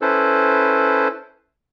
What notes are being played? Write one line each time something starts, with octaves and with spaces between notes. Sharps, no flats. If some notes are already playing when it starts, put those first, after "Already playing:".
C#4 E4 A4 B4 C5